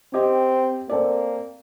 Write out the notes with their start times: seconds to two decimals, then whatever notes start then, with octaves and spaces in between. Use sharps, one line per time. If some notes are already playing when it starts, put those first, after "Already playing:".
0.14 C4 G4 D#5 G5
0.90 A#3 C4 A4 D5